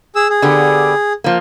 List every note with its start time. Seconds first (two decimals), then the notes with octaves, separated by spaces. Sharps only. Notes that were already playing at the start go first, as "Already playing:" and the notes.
0.16 G#4 E6
0.29 G#4
0.42 D3 B3 G4
1.24 F3 A#3